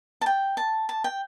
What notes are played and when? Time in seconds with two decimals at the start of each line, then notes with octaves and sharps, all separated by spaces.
0.21 A5
0.26 G5
0.57 A5
0.89 A5
1.04 G5